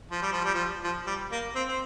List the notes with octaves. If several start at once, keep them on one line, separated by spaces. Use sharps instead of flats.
F3
G3
F3
G3
F3
F3
G3
A#3
C4
C4